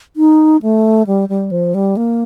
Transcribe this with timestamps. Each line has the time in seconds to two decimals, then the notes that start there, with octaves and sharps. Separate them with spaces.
0.16 D#4
0.62 A3
1.07 G3
1.29 G3
1.51 F3
1.74 G3
1.97 A#3